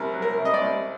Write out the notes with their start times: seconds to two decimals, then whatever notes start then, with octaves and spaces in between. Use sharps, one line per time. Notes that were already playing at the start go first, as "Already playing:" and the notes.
Already playing: C2 A#4
0.14 F#3
0.22 A#4
0.38 C3
0.45 D#5
0.54 D5
0.62 C2